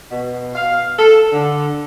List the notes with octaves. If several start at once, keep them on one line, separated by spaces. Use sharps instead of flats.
B2
F5
A4
D3